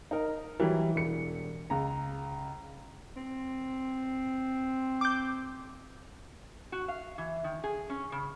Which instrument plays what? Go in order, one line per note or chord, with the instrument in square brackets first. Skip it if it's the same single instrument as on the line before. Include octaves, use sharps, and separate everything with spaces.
[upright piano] D#4 A#4
E3 F#3 G3
E1 C#7
C#2 A#5
[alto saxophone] C4
[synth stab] D6 G6
[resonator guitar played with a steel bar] F#4
F5
E3
D#3
G#4
C#4
C#3